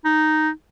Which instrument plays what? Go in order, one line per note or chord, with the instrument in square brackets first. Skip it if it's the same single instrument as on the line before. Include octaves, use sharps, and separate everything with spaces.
[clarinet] D#4